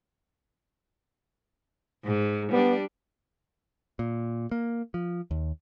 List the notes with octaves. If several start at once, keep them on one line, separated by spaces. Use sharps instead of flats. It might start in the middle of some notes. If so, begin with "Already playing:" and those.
G#2
G3 B3 D4
A#2
A#3
F3
D#2